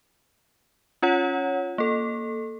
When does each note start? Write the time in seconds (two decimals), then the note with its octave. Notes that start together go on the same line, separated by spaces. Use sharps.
1.02 C#4 F4 C#5 F#5
1.78 A#3 A4